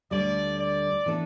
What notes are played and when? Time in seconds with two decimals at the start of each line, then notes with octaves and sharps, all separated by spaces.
0.11 D2 D3 G3 D5
0.59 D5
1.06 E3 B3 D4 A4